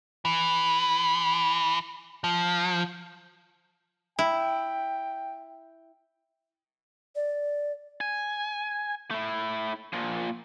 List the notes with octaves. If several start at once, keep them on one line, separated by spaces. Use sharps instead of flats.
E3
F3
E4 G5
D5
G#5
A3 E4
A#2 F3